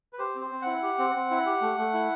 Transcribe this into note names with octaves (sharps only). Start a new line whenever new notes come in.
B4
G4 C5
C4
C5
C4
E4 F#5
G4
C4
C4
E4
G4
A3
A3
E4